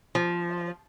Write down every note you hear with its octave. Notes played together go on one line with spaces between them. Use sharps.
F3